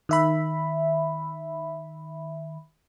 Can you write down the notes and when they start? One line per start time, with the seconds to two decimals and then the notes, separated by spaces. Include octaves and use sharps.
0.09 D#3 E5 B5